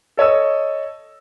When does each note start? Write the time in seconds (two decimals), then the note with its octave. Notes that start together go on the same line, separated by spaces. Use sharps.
0.17 A4 C#5 D#5 E6